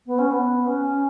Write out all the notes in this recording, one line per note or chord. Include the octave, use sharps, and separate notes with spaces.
B3
C#4
B3
C#4